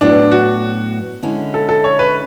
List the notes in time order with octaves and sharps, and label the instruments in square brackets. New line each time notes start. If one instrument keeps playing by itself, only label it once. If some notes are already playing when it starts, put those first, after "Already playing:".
[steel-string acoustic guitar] A2 F#3 B3 [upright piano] D4
[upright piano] F#4
[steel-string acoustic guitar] D3 G#3 C#4 E4
[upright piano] A4
A4
C#5
B4